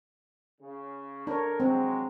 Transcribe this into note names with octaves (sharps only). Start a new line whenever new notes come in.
C#3
D3 D4 A#4 C#5
F#3 G#3 C4